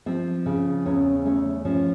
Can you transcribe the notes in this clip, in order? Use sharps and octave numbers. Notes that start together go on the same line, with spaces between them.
F3 C4
C#3
E2 C#4
A3 C#4
F3 C#4